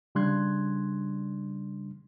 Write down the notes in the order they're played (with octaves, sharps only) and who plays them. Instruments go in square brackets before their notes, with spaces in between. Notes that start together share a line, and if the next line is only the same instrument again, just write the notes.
[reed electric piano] C#3 G3 D4 C6 F#6 G#6